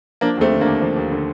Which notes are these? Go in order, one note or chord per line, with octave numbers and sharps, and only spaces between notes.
F3 A#3 D4
D#2 A3 C4
D3
D#2 A#3 D4
F3
D#2
D3